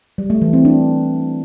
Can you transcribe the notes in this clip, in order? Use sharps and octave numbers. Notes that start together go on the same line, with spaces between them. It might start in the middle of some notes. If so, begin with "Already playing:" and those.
G3
A3
E3
C4
D4